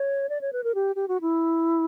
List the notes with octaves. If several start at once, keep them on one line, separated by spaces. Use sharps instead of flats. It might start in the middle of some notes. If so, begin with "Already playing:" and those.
Already playing: C#5
D5
C#5
B4
A#4
G4
G4
F#4
E4